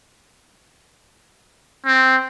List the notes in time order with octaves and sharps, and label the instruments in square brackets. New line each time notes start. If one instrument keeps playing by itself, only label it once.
[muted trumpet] C4